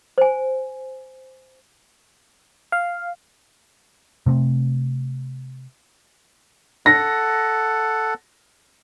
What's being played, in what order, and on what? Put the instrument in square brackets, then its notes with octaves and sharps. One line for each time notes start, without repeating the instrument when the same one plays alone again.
[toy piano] C5 G#5
[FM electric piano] F5
[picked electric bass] C3 A3 A#3 C4
[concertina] A4 F#5 [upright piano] A#6